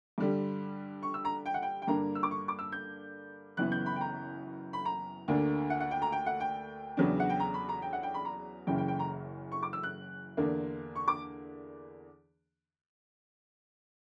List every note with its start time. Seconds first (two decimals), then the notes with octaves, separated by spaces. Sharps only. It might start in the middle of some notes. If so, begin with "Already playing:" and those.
0.18 G2 D3 G3
1.03 C#6
1.14 E6
1.25 A#5
1.46 G5
1.54 F#5
1.62 G5
1.82 G5
1.87 G2 D3 A#3 D4 A#5
2.15 E6
2.23 D6
2.31 C#6
2.48 D6
2.59 E6
2.72 G6
3.57 F#1 F#2 E3 B3 F#6
3.72 G6
3.86 B5
3.96 G5
4.01 A#5
4.73 B5
4.85 A#5
5.28 D2 D3 A#3 D4
5.70 F#5
5.80 F#5
5.91 G5
6.02 A#5
6.12 G5
6.26 F#5
6.40 G5
6.97 E2 C#3 F#3 B3 D4
7.20 F#5
7.30 G5
7.40 A#5
7.54 B5
7.69 A#5
7.82 G5
7.93 F#5
8.03 G5
8.14 B5
8.25 A#5
8.67 F#1 F#2 C#3 E3 G5
8.78 G5
8.88 G5
8.99 A#5
9.52 C#6
9.63 D6
9.73 E6
9.83 F#6
10.37 E2 D3 A#3 D4
10.95 C#6
11.08 D6